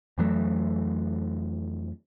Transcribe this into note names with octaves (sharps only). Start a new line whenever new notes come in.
F2 E3 F#3 A3